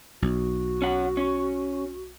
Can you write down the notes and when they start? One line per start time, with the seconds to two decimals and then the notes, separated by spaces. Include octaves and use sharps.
0.22 B1 F#4
0.82 C#4 F#5
1.17 C#4